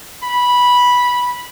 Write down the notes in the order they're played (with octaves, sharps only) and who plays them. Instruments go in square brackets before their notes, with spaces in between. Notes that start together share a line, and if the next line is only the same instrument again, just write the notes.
[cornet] B5